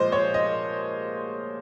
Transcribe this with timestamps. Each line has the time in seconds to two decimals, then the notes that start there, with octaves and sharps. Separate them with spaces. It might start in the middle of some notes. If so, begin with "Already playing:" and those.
Already playing: A#2 F3 G#3 C5 D#5
0.12 C#5
0.34 D#5